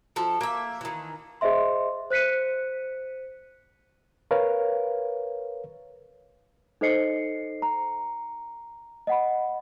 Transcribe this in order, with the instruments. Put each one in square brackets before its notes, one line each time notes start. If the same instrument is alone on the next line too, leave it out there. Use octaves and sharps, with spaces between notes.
[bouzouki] F3 A4
A#3 E5
D#3 E3
[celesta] G#4 C5 D#5 E5 C6
C5 F#6 B6 C#7 D#7
[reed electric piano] A#4 B4 C#5 F5
[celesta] D#4 A4 C5 D#5 C7 C#7
A#5
D#5 F#5 B5